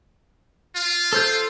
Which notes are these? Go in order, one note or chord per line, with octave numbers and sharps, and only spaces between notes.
F4
A4 C5 G6